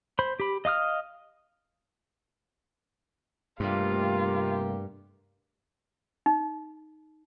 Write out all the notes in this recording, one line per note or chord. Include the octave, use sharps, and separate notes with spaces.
C5 B5
G4 B5
D#5 F5 D#6 F6
G2 C3 G3 A3 A#3 F4 G4
D#4